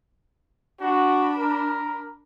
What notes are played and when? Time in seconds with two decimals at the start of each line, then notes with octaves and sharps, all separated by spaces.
0.80 D4 F#4 B5
1.38 A#4